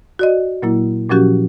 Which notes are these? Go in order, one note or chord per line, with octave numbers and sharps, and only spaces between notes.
F#4 D5 D#5
A#2 F#3 A#3 E4
A#2 F3 F#3 C#4 F#4 G4